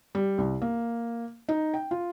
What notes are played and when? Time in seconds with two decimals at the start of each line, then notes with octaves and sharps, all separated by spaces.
0.15 G3
0.38 C2
0.62 A#3
1.49 D#4
1.74 G5
1.91 F4